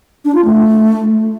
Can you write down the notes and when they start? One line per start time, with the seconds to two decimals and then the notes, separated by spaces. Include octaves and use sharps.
0.25 D4
0.35 F4
0.45 A3